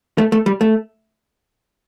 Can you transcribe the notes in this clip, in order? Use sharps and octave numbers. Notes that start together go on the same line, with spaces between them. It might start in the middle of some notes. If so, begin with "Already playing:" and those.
A3
A3
G3
A3